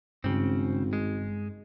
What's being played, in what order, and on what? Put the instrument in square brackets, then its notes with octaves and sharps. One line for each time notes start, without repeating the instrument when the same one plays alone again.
[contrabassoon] G#1 [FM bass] G2 [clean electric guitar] C#3 C4
[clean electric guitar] G#3